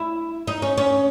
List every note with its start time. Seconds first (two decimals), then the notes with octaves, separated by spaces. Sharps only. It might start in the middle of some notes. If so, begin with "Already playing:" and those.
Already playing: E4
0.47 D#4
0.62 C#4
0.78 C#4